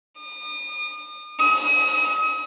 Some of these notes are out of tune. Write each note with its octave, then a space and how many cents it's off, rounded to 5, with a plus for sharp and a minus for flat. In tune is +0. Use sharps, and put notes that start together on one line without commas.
D#6 -40
D#6 +40